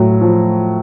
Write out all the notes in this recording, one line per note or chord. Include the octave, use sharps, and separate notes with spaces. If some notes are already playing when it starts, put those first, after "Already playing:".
Already playing: A2 F#3
F3